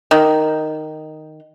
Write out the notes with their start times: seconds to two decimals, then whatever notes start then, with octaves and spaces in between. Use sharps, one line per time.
0.11 D#3